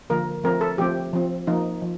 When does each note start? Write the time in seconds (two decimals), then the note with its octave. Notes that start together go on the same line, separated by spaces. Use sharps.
0.10 D3 F3 A#3 A#4
0.44 F3 A3 C4 A#4
0.61 A4
0.78 F3 A3 C4 G4
1.13 F3 C4
1.47 F3 A#3 D#4
1.82 F3